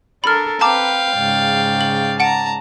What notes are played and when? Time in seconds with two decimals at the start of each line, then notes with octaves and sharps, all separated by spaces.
0.24 D4 A4 A#4 B5 F6
0.61 C4 B4 F5 G5 A5 A#5 D6
1.16 G#2 C#3 D5
1.81 F#7
2.20 F#5 A5 A#5 D7